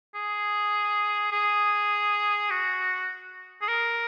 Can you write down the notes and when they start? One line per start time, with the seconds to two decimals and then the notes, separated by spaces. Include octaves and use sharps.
0.15 G#4
1.32 G#4
2.50 F#4
3.61 G#4
3.68 A#4